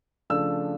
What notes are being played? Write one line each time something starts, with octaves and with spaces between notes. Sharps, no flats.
C#3 F3 A3 D4 E6